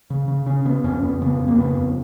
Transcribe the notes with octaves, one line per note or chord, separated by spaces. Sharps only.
C#3
C#3
C#3 C#4
C#3 B3
F2 C#4
F2 B3
C#3 B3
F2
A#3
C#3 B3
F2